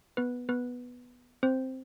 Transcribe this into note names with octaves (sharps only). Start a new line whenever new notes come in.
B3 B4
B3 B4
C4 C5